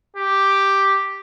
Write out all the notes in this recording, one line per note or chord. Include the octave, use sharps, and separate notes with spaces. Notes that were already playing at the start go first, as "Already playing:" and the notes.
G4